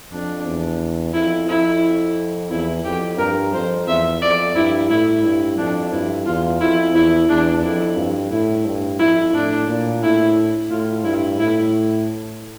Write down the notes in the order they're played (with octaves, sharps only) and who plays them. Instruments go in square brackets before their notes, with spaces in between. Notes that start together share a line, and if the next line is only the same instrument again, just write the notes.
[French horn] F2 [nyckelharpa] D4
[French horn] E2
[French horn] F2 [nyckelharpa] E4
[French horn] F2 [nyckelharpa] E4
[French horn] E2 [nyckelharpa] E4
[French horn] F2 [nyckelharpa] G4
[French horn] G2 [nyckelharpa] A#4
[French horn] F2 [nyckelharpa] C5
[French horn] E2 [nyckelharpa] E5
[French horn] F2 [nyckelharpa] D5
[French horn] G2 [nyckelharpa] E4
[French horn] A2 [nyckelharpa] E4
[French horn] G2 [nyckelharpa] E4
[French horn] F2 [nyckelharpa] D4
[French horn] G2 [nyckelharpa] E4
[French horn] E2 [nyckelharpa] F4
[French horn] F2 [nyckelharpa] E4
[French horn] E2 [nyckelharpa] E4
[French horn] E2 [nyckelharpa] D4
[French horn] F2 [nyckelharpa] E4
[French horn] G2
[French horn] A2 [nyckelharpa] E4
[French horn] G2
[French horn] F2 [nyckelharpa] E4
[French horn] A2 [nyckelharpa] D4
[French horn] A#2
[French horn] A2 [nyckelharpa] E4
[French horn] A2 [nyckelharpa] F4
[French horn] G2 [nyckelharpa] E4
[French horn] A2 [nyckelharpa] E4